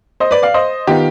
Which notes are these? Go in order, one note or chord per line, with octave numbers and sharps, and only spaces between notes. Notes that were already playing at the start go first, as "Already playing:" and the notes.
C5 D#5
B4 D5
D5 F5
C5 D#5
D#3 B3 F4 G4